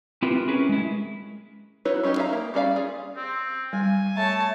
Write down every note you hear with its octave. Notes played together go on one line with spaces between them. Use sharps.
C4 E4 F4 G4 A#4 B4
C#4 E4 G#4 A#4 B4
G#3 E4
D#4 E4 F#4 B4 C#5
F#3 C#4 D#4 G4
G#4 E5 F5 A5 A#5
A#3
G3 C#4 D5 F5
F4 G#4
C4
G3 G#5
A3 C#5 A5